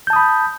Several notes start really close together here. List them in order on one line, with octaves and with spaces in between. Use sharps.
G6 A5 D#6 B5